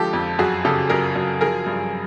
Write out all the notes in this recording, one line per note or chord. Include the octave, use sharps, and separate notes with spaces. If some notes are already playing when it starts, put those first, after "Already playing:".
Already playing: D3 F3 G#3 G4 A4
F2
F#2 F#4 G#4
C#3 G4 A4
F#2 G#4 A#4
F#2
F3 G#4 A#4
G2